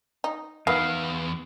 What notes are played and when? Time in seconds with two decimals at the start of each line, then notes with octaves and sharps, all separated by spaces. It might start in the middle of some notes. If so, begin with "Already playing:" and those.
0.24 D#4
0.67 E2 D#3 F#3 B3 B4 F5